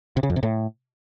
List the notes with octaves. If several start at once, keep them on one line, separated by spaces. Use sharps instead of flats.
C3
C#3
F2
C3
A2